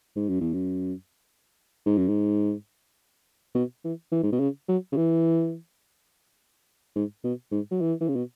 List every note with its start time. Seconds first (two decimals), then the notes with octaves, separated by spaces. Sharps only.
0.16 G#2
0.28 F#2
0.41 E2
0.53 F#2
1.86 G#2
1.97 F#2
2.08 G#2
3.55 B2
3.84 E3
4.12 E3
4.23 G#2
4.32 B2
4.40 C#3
4.68 F#3
4.92 C#3
4.97 E3
6.96 G#2
7.24 B2
7.51 G#2
7.71 F#3
7.81 E3
8.00 E3
8.08 C#3
8.16 B2